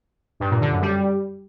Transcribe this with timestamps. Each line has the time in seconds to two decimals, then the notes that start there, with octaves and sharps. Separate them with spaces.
0.40 G2
0.50 A#2
0.61 D3
0.71 F#2
0.82 G3